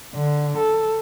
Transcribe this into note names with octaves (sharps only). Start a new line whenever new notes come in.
D3
A4